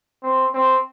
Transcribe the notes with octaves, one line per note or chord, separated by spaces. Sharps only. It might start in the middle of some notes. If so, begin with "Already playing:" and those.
C4
C4